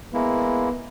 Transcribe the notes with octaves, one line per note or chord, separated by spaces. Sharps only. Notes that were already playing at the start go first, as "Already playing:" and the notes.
G#3 A#3 B3 E4